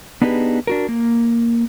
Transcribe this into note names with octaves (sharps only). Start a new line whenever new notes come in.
B3 D4 D#4 G4 G#4 B4
D4 F#4 A#4
A#3